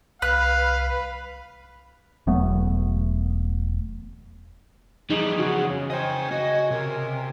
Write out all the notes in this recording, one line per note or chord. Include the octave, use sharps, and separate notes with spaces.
C2 B4 F5 F#6
E1 F#3 A3 B3
F2 E3 G3 D#4 G#4
C#3 F#4
C#4
C5 D#5 G5 G#5
F#4 D#5
C3 A#4